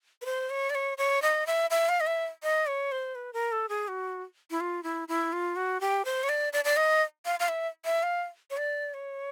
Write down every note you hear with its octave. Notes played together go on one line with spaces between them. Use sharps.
B4
C5
C#5
D5
C#5
C#5
D#5
E5
E5
F5
D#5
E5
D#5
C#5
C5
B4
A#4
A4
G#4
F#4
E4
F4
E4
E4
F4
F#4
G4
C5
C#5
D5
D5
D5
D#5
F5
F5
E5
E5
F5
C#5
D5
C#5